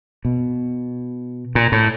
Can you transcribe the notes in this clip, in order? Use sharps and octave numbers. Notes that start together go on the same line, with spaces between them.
B2
A#2
A2